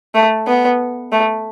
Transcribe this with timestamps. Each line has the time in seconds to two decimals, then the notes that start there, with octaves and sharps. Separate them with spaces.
0.15 A3
0.48 B3
1.12 A3